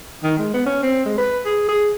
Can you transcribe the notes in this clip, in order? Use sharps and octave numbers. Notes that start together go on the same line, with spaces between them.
D#3
G#3
B3
C#4
C4
G#3
B4
G#4
G#4